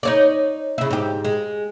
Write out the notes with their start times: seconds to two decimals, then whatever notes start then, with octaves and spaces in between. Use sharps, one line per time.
0.03 D#4 C#5 D5
0.78 C#3 E4
0.90 G#2 G4
1.25 G#3